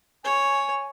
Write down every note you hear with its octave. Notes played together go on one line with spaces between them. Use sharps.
C#5 G#5